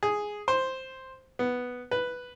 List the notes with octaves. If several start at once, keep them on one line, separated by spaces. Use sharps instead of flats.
G#4
C5
B3
B4